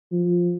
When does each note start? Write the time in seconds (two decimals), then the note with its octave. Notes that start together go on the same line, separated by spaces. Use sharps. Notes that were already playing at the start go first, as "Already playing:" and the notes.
0.12 F3